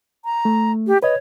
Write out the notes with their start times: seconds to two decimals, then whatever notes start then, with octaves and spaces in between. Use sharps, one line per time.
0.25 A#5
0.45 A3
0.87 G4
1.03 B4 C#5 D#5